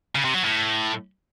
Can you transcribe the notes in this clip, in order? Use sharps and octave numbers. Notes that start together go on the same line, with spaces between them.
C#3
C3
F#3
A2